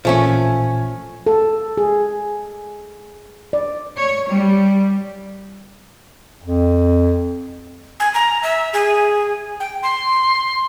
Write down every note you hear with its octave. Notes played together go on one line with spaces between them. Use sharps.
A1 A#2 F3 A3 C#4 G#5
A4
G#4
D5
C#5
G3
F2
G#5
A#5
E5
G#4
G5
C6